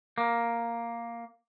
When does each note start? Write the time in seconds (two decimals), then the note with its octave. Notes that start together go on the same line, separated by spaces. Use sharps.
0.18 A#3